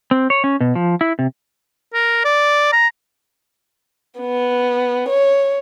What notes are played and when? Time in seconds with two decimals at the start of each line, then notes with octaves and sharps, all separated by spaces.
0.11 C4
0.30 C#5
0.44 C#4
0.60 B2
0.75 F3
1.01 E4
1.19 C3
1.94 A#4
2.25 D5
2.72 A#5
4.20 B3
5.09 C#5